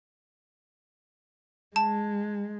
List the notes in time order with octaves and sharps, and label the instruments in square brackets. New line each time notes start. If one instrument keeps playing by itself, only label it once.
[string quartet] G#3 [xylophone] A5